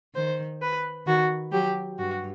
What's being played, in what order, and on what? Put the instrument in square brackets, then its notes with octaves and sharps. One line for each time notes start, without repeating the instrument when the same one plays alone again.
[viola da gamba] D#3 [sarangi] C5
[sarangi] B4
[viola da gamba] D#3 [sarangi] F#4
[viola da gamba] F#3 [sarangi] G4
[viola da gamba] G2 [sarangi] F#4